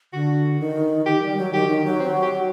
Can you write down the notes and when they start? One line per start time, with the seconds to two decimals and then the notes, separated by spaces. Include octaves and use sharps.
0.13 D3 F#4
0.60 D#3
1.06 D#3 G4
1.22 G3
1.37 F#3
1.53 D#3 G4
1.68 D#3
1.84 F#3
2.00 C4
2.22 G4